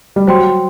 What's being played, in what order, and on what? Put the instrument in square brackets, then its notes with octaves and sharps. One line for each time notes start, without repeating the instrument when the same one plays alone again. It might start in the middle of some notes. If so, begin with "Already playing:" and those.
[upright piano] G3
[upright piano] F#3 [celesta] C5 G5 C6